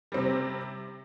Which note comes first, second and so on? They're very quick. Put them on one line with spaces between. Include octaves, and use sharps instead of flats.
G3 C4 C3